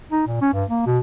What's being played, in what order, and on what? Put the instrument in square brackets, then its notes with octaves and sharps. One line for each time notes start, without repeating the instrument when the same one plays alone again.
[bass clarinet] D#4
A#2
C#4
G2
A#3
B2